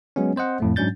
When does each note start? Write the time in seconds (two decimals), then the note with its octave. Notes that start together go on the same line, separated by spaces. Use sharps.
0.16 F#3 G#3 B3 C#4
0.36 C4 C5 D#5 F#5
0.60 F2 A2 A3
0.76 G#2 F#3 C#4 D4 G6 A6